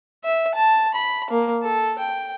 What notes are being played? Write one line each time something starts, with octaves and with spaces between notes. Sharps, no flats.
E5
A5
B5
A#3
A4
G5